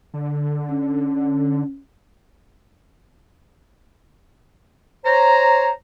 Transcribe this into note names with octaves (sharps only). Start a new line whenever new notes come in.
D3
C#4
C5 C#5 A#5